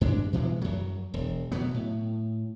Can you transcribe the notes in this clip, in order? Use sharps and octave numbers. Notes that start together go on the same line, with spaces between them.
G2 G#3 C#4 D4
B2 E3 F#3 G#3
F#2 F#3
E1
B2 F#3 B3
A2